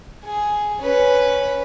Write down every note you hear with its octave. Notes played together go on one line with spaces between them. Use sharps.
G#4
C#4 B4